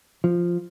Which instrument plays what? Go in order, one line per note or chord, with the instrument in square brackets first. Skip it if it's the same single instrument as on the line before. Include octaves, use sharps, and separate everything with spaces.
[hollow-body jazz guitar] F3